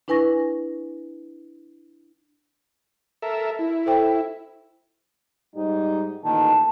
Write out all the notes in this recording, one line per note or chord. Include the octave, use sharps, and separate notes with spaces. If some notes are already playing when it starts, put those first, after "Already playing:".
D4 E4 B4 G#5 C#6 A#6
A4 A#4 E5
E4
A4 C5 G5
G#2 G3 D#4
A1 A#2 D#3 A5